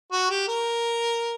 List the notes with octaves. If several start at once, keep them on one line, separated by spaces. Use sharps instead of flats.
F#4
G4
A#4